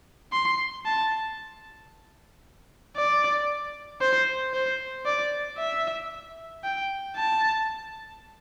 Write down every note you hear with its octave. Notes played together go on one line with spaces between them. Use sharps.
C6
A5
D5
C5
C5
D5
E5
G5
A5